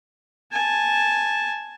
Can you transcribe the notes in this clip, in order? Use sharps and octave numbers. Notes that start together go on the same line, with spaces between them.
G#5 A5